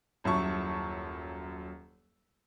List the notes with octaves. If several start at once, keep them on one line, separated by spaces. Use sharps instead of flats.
D#1 F#2 E4 A5 C#6